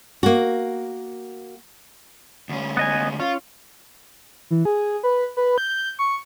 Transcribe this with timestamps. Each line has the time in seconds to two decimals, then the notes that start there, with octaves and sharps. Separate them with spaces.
0.23 A#3 F#4
2.49 D2 C#4
2.77 B3 D#5 G#5
3.20 C#4 F4
4.51 E3
4.65 G#4
5.03 B4
5.37 B4
5.58 G6
5.99 C#6